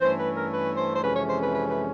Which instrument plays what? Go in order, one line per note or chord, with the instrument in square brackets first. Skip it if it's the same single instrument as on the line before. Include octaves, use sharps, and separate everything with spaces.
[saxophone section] G2 E3 A3 C#4 C5
B4
A#4
B4
C5
C5
F2 C3 E3 G#3 C#4 B4
C#5
C5
B4
B4
B4